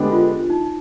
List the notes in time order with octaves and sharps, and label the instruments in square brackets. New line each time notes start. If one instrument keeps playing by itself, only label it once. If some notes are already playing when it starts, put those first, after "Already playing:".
Already playing: [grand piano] D3 G#3 B3 D4 G4
[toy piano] F4
D#4